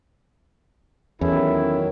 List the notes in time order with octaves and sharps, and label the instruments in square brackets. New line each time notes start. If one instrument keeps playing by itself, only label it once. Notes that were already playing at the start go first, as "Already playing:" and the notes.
[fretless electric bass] E2 [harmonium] D#3 F#3 [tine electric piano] C#4 A4 [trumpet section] E4